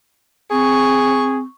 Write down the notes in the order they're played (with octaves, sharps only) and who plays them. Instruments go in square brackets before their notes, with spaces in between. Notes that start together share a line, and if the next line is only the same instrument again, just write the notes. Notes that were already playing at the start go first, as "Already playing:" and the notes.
[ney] C4 [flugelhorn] G#4 [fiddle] C#6